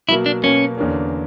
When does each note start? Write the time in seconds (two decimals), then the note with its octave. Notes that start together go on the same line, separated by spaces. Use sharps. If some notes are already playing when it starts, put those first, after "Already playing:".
0.09 B2 F#3 A#3 E4
0.26 D4
0.43 B2 F#3 A#3 C#4
0.77 E2 D3 A#3 C#4